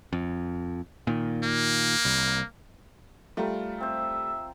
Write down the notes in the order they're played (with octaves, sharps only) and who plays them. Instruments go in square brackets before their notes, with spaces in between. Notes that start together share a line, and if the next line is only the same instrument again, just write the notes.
[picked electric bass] F2
A#2 D#3
[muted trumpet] A#3
[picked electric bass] C2
[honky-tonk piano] G3 A3 [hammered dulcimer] F4 A#4
[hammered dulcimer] C4 C5 [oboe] E5